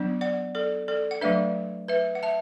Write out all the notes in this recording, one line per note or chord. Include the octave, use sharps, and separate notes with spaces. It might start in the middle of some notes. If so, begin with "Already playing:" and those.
Already playing: F#3 B3 D4
D5 F#5
A4 D5
A4 D5
F#5
F#3 A3 D4 B4 E5
B4 E5
F#5
E5 A5